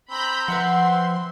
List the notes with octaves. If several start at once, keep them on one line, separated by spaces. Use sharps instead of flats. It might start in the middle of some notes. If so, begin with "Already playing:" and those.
C4 A#5 B5 G6
F3 B4 E5 F#5 C6